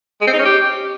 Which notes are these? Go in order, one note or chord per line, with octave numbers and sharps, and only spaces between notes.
G#3
C4
D#4
C#4
G4